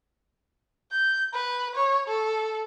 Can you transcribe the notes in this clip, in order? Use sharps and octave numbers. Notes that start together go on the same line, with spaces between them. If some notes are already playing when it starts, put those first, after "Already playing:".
G6
B4
C#5
A4